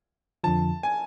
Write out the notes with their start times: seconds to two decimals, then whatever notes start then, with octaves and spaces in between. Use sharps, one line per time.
0.44 F2 D3 F3 A5
0.83 G#5